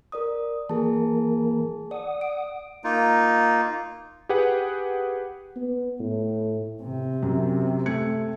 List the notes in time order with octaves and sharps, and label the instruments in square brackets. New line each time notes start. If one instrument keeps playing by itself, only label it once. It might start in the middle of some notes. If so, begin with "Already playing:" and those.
[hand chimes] A#4 D5 D#6
[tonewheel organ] E3 A#3 A#4 [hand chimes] G#4 A5
[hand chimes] D5 [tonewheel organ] F#5 D#6
[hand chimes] D7
[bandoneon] A#3 D#4 F4
[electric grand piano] G4 G#4 B4 F#5
[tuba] B3
A2
[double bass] C3
[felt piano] F#2
A3 G#6 C#7